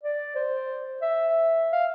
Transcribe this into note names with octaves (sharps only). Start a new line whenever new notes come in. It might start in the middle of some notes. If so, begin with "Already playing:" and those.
D5
C5
E5
F5